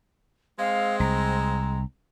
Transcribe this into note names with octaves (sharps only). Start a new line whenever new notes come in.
G#3 C4 F5
C2 A#5